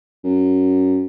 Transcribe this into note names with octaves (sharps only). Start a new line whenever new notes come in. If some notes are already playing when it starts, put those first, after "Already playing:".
F#2